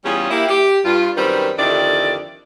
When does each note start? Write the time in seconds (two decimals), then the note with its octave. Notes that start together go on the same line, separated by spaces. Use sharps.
0.05 E2 G3 C#4 F4 G#4
0.31 A#3 E4 G4
0.49 G4
0.85 G2 F4
1.17 F#2 D#3 G3 C4 B4 C5
1.58 F2 D3 D#3 E4 G4 D5